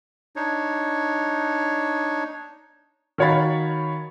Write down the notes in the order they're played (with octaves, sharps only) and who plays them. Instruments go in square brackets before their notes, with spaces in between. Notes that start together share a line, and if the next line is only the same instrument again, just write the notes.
[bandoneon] D4 D#4 C#5
[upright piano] D#3 F#4 C#5 F5 B5 A6